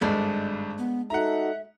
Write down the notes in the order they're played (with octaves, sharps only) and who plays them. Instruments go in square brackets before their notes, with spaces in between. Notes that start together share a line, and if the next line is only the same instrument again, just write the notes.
[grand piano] G#1 G2 [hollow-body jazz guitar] G#3 A3 D4
[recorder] B3
[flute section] D#4 F#4 A4 [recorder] E5 [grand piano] F#5 A#5